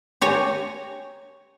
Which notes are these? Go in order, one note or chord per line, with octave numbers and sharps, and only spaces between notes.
G4 C#5 G#5 A#5